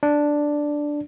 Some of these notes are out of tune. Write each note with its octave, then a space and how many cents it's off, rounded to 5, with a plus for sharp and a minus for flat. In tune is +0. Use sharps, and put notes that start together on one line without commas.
D4 +0 D5 +0